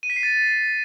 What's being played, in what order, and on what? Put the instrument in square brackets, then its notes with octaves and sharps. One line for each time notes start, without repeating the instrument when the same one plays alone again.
[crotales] D#7
B6
C7
A6